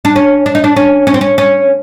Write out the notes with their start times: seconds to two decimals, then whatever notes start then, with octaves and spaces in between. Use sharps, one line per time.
0.05 D4
0.16 C#4
0.46 D4
0.55 D#4
0.64 D4
0.76 C#4
1.07 C#4
1.14 C4
1.21 C#4
1.38 C#4